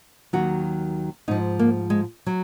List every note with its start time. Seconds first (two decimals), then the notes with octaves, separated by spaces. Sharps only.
0.33 D#2 D#3 F#3 F#4
1.28 G#2 F3 D#4
1.59 A#3
1.90 G#3
2.26 F#3